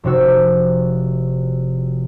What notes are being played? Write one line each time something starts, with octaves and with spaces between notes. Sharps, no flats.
F1 C3 F#4 E6